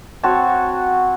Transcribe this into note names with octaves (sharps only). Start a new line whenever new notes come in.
C4 F#4 C#5 A5